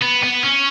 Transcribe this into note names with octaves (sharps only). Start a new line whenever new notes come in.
B3
B3
C#4